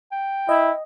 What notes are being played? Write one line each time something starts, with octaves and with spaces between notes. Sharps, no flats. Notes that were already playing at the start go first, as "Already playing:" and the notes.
G5
E4 D#5